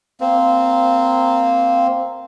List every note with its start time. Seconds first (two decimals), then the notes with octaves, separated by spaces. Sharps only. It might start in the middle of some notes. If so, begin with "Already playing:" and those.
0.20 A#3 C4